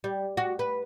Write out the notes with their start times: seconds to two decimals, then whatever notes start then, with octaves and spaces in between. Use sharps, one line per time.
0.04 G3
0.37 F#4
0.59 B4